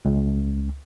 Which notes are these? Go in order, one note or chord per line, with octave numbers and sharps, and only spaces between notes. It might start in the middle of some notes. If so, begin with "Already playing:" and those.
C#2